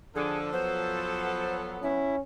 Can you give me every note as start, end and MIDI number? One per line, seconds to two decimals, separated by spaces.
0.15 0.52 50
0.15 1.82 53
0.15 0.39 68
0.15 1.82 69
0.53 2.02 54
0.53 2.02 59
0.53 1.55 72
1.83 2.20 61
1.83 2.16 64